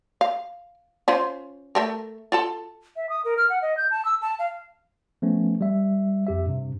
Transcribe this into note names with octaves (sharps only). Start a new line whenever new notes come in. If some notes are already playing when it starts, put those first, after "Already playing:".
F5
C#4 F4 C5
A3 A4 A#4
F4 A4 A5
E5
D#6
A#4
F6
F#5
D#5
G6
A5
E6
A5
F5
F3 A3 B3 C#4
G3 E5
F2 G4 E5
G2 C3